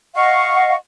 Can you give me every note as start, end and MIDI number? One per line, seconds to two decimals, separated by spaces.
0.15 0.74 75
0.15 0.74 77
0.15 0.74 78
0.15 0.74 85